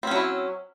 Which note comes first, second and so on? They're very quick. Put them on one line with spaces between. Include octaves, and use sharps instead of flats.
C4 C#4 F#3 E4